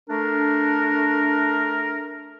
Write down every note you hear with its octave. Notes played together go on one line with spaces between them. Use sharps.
A3 D4 A#4